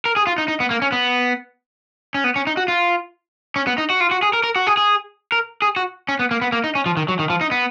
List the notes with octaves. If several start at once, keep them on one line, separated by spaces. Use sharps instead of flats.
A#4
G#4
F4
D#4
D#4
B3
A#3
C#4
B3
C#4
B3
C#4
D#4
F#4
F4
C#4
B3
D#4
F#4
F4
F#4
G#4
A#4
A#4
F#4
G#4
G#4
A#4
G#4
F#4
C#4
B3
A#3
B3
A#3
D#4
C#4
F3
D#3
F#3
D#3
F3
D#4
B3